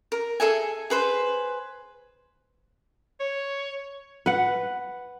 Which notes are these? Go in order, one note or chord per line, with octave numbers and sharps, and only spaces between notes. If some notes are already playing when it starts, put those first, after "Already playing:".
A#4
G#4 A4 E5 G#5
G#4 B4 C5
C#5
B4 F#5